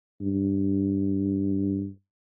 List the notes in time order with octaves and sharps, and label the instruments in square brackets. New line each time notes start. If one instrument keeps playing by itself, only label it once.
[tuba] G2